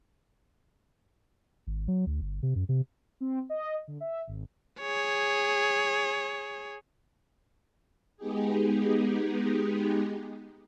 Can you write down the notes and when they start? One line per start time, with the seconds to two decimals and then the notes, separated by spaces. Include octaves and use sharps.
1.67 G#1
1.88 F#3
2.06 D2
2.21 G1
2.43 C3
2.56 F#2
2.69 C3
3.20 C4
3.50 D#5
3.88 D3
4.00 E5
4.27 G#1
4.81 G#4 C#5
8.17 G#3 B3 D#4 G4 G#4